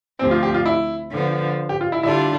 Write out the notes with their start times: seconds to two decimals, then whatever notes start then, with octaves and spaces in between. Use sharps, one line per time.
0.19 D2 C3 F3 C4
0.31 F4
0.43 G4
0.54 F4
0.66 E4
1.12 D3 F3 B3
1.69 G4
1.81 F4
1.92 E4
2.03 D3 G3 D4 E4 F4